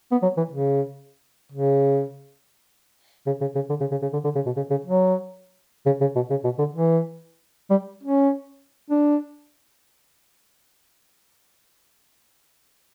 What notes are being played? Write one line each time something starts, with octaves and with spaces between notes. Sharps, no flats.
B3
F#3
E3
C#3
C#3
C#3
C#3
C#3
D3
C#3
C#3
C#3
D3
D3
C#3
B2
C#3
C#3
F#3
C#3
C#3
B2
C#3
B2
D3
E3
G3
C#4
D4